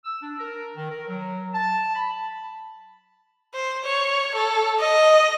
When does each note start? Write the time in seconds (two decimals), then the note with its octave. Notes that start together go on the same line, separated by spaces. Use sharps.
0.05 E6
0.21 D4
0.38 A#4
0.75 D#3
0.89 A#4
1.08 F#3
1.54 A5
1.94 B5
3.54 C5
3.84 C#5
4.35 A4
4.80 D#5